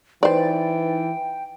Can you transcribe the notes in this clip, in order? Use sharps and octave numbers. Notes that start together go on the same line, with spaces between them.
E3 D#4 B4 C5 D5 G5 A6